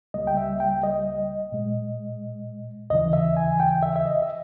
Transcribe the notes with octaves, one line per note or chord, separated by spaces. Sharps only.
C#2 C#3 G3 A#3 D#5
G5
E5
G5
D#5
A#2 G#3
D#2 C#3 E3 D#5
E5
G#5
G5
E5
E5
D#5
E5